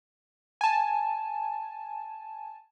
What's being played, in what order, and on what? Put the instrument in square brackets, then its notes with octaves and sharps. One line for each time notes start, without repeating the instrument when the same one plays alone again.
[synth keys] G#5 A5